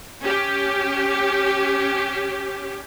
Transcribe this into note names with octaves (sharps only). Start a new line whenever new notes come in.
C#4 G4